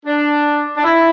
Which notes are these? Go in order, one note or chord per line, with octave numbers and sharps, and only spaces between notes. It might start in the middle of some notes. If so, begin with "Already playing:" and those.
D4
D4
E4